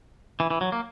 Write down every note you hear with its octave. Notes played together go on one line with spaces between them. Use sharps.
E3
E3
F#3
A#3